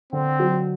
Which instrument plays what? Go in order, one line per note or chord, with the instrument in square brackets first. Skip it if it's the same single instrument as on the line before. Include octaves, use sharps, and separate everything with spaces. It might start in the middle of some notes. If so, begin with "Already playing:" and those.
[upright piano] D3 [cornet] C4
[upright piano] F#3